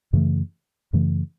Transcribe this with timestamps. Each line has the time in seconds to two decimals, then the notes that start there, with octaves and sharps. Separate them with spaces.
0.13 F#2 C#3 E3 A3
0.93 F#2 C#3 E3 A3